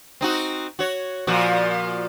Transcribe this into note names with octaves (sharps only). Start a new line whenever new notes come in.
C4 D#4 F#4
F#4 C#5
A#2 F3 F#4